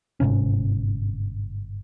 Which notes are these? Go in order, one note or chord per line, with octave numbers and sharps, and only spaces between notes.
G1 G#2 C3 C#4